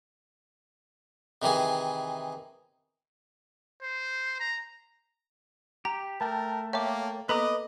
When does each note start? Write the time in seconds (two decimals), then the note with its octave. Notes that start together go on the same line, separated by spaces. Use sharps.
1.42 C3 D#3 E3 G#4
3.82 C5
4.40 A#5
5.85 G4 A#5
6.21 A3 A#4 G5 A5
6.73 A#3 C#5 E5 G5 A5 D6
7.29 A#3 B3 A4 B4 D#5 A#5 D6 D#6